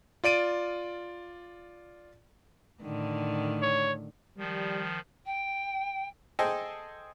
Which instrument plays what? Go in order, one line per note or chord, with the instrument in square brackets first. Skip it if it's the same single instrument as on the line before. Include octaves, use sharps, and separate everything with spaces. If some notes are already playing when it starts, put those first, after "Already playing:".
[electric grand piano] F4 D5 D7 D#7
[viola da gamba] A2 D3 D#3
[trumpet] C#5
[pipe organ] D#3 F3 [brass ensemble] G3
[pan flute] G5
[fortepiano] G#4 A4 C5 D#5 G5